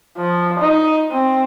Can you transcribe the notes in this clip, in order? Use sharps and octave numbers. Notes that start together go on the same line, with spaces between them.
F3
D#4
C4